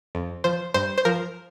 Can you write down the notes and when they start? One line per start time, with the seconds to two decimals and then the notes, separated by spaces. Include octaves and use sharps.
0.15 F2
0.44 F3 C5
0.74 G2 C5
0.98 C5
1.05 F3 A#4